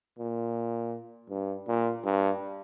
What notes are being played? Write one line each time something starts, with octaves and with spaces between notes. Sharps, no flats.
A#2
G2
A#2
G2